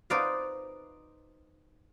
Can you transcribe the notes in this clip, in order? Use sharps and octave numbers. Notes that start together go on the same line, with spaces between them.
D#4 B4 C5 D5 D#5 F5